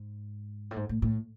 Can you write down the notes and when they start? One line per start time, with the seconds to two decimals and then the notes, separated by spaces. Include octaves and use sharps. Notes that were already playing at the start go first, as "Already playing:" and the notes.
Already playing: G#2
0.71 A2
0.76 G#2
0.89 A2
1.02 A2